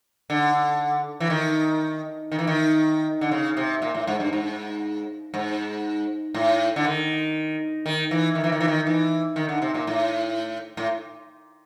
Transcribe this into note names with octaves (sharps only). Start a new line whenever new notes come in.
D3
E3
D#3
D#3
E3
D#3
D3
C#3
C3
A#2
A2
G#2
G2
G#2
G#2
A2
D3
D#3
D#3
E3
D#3
E3
D#3
E3
D#3
E3
D#3
D3
C3
A#2
A2
A2